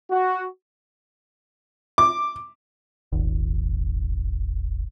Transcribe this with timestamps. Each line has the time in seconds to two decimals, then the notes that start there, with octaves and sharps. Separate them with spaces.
0.10 F#4
1.98 D6
3.12 D#1 G#1